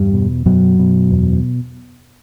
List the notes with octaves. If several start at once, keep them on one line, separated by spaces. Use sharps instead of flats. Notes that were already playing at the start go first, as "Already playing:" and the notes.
Already playing: E2 G2 G3
B2
F#2 B2 F#3
B2
E2